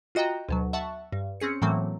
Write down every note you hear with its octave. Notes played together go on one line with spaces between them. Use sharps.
F4 F#4 D#5 G5 A#5
D2 B2 F#3
E5 F#5 A5 C#6
G2
C4 C#4 G#4 C#7
A2 E3 F#3 A3 A#3 C4